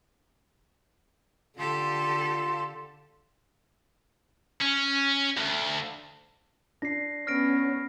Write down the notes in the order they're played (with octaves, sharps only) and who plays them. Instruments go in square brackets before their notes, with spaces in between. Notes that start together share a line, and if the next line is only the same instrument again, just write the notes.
[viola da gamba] D3 [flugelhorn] F4 [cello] G4 A4 [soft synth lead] C6
[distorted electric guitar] C#4
D2
[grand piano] D4 [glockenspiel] A#6 C7
[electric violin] B3 C#4 [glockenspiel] F6 A#6 D7